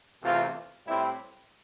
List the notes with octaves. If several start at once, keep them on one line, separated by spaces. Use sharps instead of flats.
E2 C3 E3 A3 C4 F4
A2 G3 C4 E4